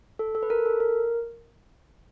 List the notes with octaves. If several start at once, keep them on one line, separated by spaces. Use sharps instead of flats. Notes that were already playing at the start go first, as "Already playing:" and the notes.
A4
A4
B4
A#4
A4
A#4